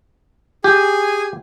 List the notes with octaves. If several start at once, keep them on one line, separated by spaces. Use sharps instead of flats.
G4 G#4 G#5